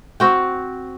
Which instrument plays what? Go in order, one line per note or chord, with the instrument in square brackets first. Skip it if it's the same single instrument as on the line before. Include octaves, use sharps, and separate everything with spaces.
[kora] C4 F#4 G5